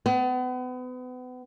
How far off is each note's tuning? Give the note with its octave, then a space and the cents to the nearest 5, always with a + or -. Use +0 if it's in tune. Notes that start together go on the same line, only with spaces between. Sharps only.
B3 +35